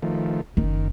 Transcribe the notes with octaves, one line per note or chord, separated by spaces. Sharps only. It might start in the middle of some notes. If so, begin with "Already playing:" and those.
D#3 F3 A3
F#1 D#3